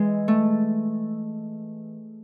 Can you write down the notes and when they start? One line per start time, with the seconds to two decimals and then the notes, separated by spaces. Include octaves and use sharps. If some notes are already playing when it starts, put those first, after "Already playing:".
Already playing: E3 G#3
0.28 A3